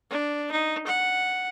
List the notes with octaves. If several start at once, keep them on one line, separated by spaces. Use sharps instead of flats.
D4
D#4
F#5